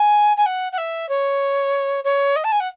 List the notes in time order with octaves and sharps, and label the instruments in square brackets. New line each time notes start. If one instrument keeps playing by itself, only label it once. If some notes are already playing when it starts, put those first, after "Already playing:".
Already playing: [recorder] G#5
G#5
F#5
F#5
E5
C#5
C#5
D#5
A5
G#5
F#5